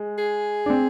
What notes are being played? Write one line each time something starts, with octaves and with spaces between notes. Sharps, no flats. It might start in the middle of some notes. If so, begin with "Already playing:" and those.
Already playing: G#3
G#4
D4
C4